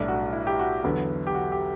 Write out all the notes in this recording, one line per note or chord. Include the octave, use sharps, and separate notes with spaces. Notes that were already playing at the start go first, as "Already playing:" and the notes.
Already playing: B1 A2 G3 D4
F#4
E4
G4
F#4
E2 D3 F#3 B3
G4
F#4
G4